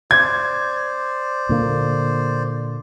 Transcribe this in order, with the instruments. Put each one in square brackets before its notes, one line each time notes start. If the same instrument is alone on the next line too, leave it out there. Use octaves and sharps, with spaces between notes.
[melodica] C5 D5 [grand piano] G#6
[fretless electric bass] A#2 D3 A#3